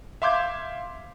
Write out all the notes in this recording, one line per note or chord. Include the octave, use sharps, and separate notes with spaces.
E5 F5 C6 D6 G6 G#6